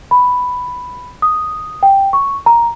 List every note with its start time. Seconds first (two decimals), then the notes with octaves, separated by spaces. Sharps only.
0.11 B5
1.22 D#6
1.83 G5
2.13 C#6
2.46 A#5